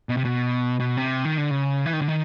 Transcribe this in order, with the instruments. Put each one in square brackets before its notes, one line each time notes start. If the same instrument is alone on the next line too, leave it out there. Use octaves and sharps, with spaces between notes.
[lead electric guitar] B2
C3
B2
B2
C3
D#3
D3
C#3
E3
D#3
D3
D#3